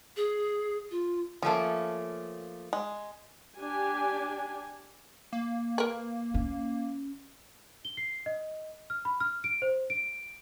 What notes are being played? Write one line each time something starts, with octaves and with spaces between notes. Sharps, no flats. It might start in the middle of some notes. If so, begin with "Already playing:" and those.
G#4
F4
F3 A3 A#3 C#4 A4
G#3
D4 G4 G#5
A#3
A#4 B4
C#4
G7
C7
D#5
F6
B5
F6
D7
C5
D7